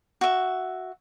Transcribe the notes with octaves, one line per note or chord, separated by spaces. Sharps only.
F#4 E5